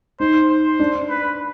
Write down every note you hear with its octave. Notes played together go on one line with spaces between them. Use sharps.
D#4 C5
C5
D4
B4